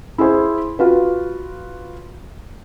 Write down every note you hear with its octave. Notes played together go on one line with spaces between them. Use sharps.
E4 G#4 C5
F4 F#4 B4